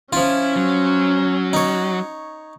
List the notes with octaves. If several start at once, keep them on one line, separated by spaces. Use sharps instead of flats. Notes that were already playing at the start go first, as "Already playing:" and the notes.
F3 C#4 E4 F4
F#3
D#4 C#5